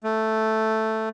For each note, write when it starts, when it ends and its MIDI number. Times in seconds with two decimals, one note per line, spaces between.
0.04 1.09 57